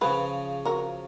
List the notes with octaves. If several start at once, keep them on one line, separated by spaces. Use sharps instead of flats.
C#3 F3 G#4 B4
F#4 A#4